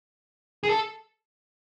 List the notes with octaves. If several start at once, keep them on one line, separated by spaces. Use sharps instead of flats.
G#4
A4